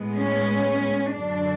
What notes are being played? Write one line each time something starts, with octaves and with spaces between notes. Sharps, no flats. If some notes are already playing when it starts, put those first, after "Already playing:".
Already playing: A2 G#3 B3
C#4
F#2 D3 F#3 D4